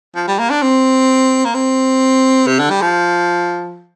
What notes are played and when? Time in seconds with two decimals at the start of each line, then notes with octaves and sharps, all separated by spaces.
0.16 F3
0.28 G3
0.39 A#3
0.50 D4
0.62 C4
1.45 A#3
1.55 C4
2.47 C3
2.59 D3
2.70 G3
2.82 F3